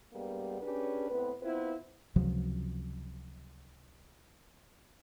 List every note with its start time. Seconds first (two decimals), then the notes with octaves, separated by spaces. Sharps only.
0.13 G2 G3 G#3 A#3 B3
0.61 C#4 D4 G4 G#4 B4
1.09 A2 B3 C4 B4
1.42 B3 C4 E4 F4 B4 C5
2.16 C#2 C3 F3 F#3